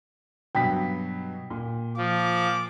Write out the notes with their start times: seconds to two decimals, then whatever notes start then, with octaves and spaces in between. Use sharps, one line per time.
0.55 G2 B2 F#3 G5 B6
1.50 A#2
1.97 F3 D6